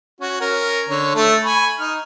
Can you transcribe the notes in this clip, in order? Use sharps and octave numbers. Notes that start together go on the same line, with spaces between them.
C#4 F#4
C#4 A#4
D3 C#5
A3 A4
G#5 B5 C#6
D#4 F6